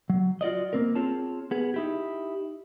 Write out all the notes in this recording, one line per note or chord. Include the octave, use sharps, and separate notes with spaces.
F#3
F4 F#4 D5 D#5
A#3 C4 A#4
C4 F4 G#4 C#5 A5
B3 G#4
D#4 E4 G4